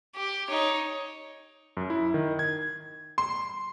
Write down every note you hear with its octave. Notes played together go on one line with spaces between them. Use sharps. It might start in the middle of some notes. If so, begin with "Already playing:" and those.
G4
D#4 C#5
F#2
E4
D#3
G#6
C6